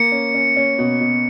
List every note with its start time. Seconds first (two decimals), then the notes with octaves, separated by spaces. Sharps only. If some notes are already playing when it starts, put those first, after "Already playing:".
Already playing: A#3 C#7
0.12 C#4
0.34 C#4
0.56 C#4
0.79 B2
1.01 B2